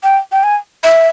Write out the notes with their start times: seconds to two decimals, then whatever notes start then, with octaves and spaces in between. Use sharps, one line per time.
0.03 G5
0.32 G5
0.44 G#5
0.84 E5